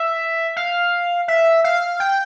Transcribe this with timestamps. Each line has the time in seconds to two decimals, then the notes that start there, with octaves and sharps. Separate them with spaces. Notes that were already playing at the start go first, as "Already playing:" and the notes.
Already playing: E5
0.56 F5
1.28 E5
1.64 F5
2.00 G5